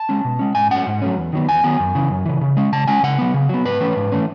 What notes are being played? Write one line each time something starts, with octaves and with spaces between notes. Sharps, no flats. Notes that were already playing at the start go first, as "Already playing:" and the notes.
Already playing: A5
G#3 C#4
B2
G#3 C#4
G#2 G#5
F#3 A3 C#4 F#5
G#2
F#3 A3 C#4
E2
D#3 F#3 B3
E2 G#5
D#3 F#3 B3
F#2
C#3 E3
F#2
C#3 E3
C#3
G#3 C#4
C#3 A5
G#3 C#4 G#5
C#3 F#5
F#3 B3
C#3
F#3 B3
G#2 B4
E3 A3 C#4
G#2
E3 A3 C#4